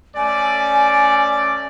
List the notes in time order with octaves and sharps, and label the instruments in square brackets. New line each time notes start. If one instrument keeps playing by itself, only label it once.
[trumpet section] A3 C#4 D5 [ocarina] G#5